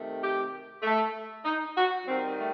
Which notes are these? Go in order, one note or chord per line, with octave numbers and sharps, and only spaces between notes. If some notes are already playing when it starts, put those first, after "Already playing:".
Already playing: C3 D#3 A3
G4
A3
D#4
F#4
D#3 G3 C4
A3